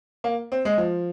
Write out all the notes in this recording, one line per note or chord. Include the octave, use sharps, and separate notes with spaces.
A#3
C4
G#3
F3